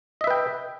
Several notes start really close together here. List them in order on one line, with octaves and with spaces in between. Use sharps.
D#5 E5 B4 G5